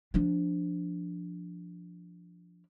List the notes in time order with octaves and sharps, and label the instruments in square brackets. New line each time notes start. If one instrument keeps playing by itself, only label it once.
[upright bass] F3 D4